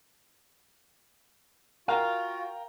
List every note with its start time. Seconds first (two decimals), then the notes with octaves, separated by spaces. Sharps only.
1.88 F4 F#4 A#4 F5 G5 A#5